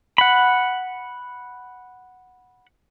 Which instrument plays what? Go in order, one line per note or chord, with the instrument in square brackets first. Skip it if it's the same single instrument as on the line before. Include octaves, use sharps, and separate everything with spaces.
[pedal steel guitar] F#5 B5